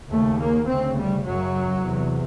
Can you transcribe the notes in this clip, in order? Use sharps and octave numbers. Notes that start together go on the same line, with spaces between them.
D#2 C#3 A3
A#3
D2 C#3 C4
G3
F#2 C#3 F#3
E2 C3